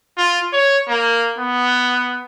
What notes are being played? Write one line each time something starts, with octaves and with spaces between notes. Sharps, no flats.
F4
C#5
A#3
B3